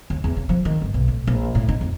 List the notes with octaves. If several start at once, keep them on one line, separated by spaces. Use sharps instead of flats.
D#2
E2
C#3
F3
D#3
G1
B1
A2
A#1
A2
D#4
F2